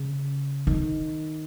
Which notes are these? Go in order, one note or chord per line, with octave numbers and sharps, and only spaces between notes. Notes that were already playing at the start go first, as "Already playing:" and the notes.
Already playing: C#3
D#3